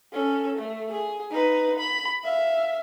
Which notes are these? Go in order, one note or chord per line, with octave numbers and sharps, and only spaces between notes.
C#4 A4
A3
G#4
D#4 B4
B5
E5 F5